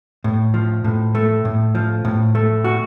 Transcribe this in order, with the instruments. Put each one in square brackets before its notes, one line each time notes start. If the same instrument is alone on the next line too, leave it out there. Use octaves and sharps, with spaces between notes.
[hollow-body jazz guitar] A2
F3
A2
A3
A2
F3
A2
A3
F#4